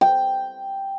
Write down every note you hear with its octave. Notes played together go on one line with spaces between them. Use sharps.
G5